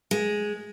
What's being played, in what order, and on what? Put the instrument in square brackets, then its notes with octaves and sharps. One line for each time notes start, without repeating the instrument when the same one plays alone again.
[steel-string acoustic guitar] G#3